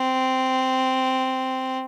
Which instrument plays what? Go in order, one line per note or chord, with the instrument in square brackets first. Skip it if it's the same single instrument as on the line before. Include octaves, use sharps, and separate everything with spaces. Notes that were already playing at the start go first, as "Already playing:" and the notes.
Already playing: [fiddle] C4